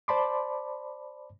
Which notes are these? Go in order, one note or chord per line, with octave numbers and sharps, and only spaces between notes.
C5 D5 A5 B5 C6 D6